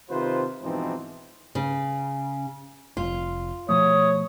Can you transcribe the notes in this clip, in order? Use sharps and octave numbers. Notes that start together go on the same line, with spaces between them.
C3 D#3 F4 B4 C5
G#2 B2 E3 F3 C4 D#4
C#3
F1 F4
B2 F3 A3 C#5 D#6